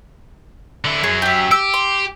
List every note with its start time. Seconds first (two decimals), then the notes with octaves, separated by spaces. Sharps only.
0.85 D3 E4
1.04 F#2 F#3 G#4
1.22 G4 E5
1.51 G4 E6
1.74 C6